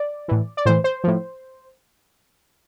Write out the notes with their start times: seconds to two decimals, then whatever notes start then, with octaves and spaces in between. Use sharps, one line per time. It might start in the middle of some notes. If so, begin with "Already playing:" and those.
Already playing: D5
0.28 A2 E3
0.57 D5
0.66 A2 E3 C5
0.84 C5
1.04 A2 F3